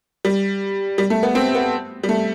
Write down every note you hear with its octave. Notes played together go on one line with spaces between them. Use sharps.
G3
G3
A3
B3
C4
B3
G3
A3